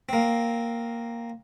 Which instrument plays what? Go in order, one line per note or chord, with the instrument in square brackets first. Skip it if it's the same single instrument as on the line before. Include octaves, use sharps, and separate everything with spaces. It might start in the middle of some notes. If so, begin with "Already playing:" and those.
[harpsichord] A#3 C4